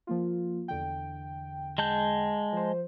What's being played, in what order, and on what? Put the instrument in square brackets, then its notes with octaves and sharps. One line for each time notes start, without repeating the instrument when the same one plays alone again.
[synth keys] F3 A#3 F4
E2 D3 G5
[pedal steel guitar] G#3 A5 G6
[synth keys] F3 C5